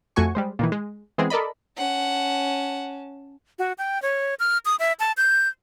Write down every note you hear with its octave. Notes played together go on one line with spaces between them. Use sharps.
F2 A3 F#4 G#5 C#6
G3 G#3 C5
A#2 D#3 E3
G#3
E3 G#3 B3 C4 G#4
A4 A#4 D5 D#5 B5
C#4 F#5 A5
F#4
G5
C#5
F6
D#6
E5
A5
G6